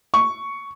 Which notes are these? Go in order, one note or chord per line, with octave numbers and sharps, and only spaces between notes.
C#6